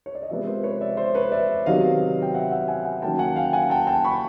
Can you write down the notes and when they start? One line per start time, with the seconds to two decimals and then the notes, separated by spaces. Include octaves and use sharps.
0.06 C#5
0.15 D5
0.22 D#5
0.29 C3 F3 G#3 B3 D5 E5
0.46 A#4 C5
0.63 B4 C#5
0.81 D5 E5
0.97 C5 D5
1.15 B4 C#5
1.32 D5 E5
1.66 C3 D#3 F#3 B3 D#5 F5
2.22 G5
2.34 E5 F#5
2.51 E5 F#5
2.68 F#5 G#5
2.85 F#5 G#5
3.02 D#3 F#3 A#3 C#4 G5 A5
3.19 F#5 G#5
3.36 F5 G5
3.53 F#5 G#5
3.70 G5 A5
3.87 G5 A5
4.04 B5 C#6